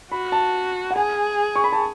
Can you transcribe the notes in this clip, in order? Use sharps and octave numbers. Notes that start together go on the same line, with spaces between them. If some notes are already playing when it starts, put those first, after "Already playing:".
F#4 B5
A5
F#5
G#4 G#5
C#6
B5
A5